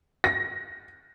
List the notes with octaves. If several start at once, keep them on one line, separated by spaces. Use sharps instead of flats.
A#6